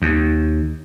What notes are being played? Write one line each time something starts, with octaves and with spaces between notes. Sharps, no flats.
D#2